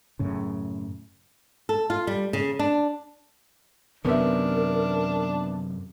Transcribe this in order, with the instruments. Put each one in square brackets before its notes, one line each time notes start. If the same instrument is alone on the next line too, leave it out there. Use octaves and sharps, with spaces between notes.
[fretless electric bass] F#2 A2 C#3
[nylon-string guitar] A4
F4
G3
C#3
D4
[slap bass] F#2 C3 D#3 [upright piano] B3 E5 [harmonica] D4 [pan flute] A#4